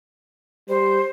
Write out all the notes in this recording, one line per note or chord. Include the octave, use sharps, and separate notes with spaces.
G3 C5